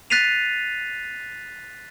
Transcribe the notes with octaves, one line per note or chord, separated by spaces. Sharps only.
F#6 A6 B6 C7 D#7 F7